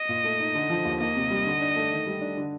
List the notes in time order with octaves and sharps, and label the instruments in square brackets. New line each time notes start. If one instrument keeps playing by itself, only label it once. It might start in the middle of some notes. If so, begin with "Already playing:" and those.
Already playing: [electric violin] D#5
[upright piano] A#2
A3
D#4
D3
F3
D#2
[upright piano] A#3 [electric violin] D#5
[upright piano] C3
G3
D3
D4
A3
D#3
G3
D4
D3